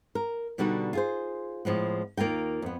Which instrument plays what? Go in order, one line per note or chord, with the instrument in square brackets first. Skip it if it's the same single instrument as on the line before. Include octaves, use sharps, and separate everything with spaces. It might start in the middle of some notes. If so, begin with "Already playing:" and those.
[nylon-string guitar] A#4
B2 D3 G3 D#4 F#4
F4 G#4 C5
A2 F3 G#3 B3
D#2 A#3 F4 A#4 G5
F2 B3